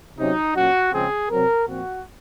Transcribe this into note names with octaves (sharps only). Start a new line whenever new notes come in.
C3 F#3 C#4 D#4
A#2 F#3 C#4 F#4
C#3 F3 G#3 C4 G#4
C3 F#3 C4 A#4
A#2 F3 C4 F#4